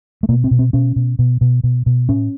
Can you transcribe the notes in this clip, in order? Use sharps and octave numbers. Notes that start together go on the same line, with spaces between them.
A3
B2 A#3
C4
B2
C4
B2 C#4
B2
B2
B2
B2
B2
A2 C#4